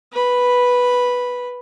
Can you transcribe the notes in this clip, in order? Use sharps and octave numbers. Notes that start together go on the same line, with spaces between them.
B4 B5